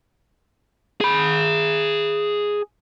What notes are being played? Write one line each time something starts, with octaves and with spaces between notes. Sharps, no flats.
G#4 B5